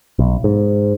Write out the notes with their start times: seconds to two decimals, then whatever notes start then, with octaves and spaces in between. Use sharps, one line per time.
0.19 B1
0.44 G#2